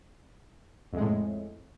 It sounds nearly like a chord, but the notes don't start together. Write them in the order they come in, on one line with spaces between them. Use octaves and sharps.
F2 G#3 A2